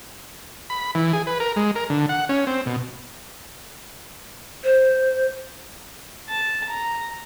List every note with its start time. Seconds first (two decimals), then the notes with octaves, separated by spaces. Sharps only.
0.70 B5
0.95 E3
1.13 G#4
1.27 B4
1.40 A#4
1.56 G#3
1.75 A#4
1.90 D3
2.09 F#5
2.29 C#4
2.47 C4
2.66 B2
4.64 C5
6.29 A5
6.69 A#5